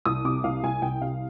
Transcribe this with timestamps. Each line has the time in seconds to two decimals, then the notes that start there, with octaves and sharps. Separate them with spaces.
0.05 C2 D#6
0.25 C3 D6
0.44 C2 F5
0.63 C2 G#5
0.82 C2 G5
1.01 C3 F5